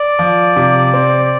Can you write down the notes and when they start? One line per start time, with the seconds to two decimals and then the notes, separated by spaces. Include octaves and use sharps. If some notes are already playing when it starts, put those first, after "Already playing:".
Already playing: D5
0.19 F3
0.56 C3
0.94 C4